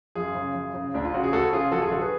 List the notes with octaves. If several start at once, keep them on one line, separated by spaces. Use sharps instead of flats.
F#2 F4 G#4
C#3
F#2
C#3
D2 D4
F4
C#3 F#4
G#4
D2 F#4 A4
C#3 F4 G#4
F#2 F#4 A4
F4 G#4
D3 F#4 A4
G#4 B4